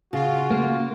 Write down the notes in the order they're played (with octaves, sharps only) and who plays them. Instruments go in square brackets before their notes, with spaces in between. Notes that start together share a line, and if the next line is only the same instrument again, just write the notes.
[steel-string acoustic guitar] C#3 [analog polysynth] F4 [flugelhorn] F#4
[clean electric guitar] A#3